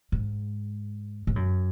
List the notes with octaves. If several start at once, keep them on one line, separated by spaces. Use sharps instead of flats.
G#2
G#2
F#2